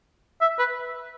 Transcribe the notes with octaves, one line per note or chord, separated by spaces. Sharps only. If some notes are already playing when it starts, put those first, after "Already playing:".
E5
B4